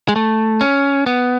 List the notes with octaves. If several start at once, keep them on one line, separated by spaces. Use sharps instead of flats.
G#3
A3
C#4
B3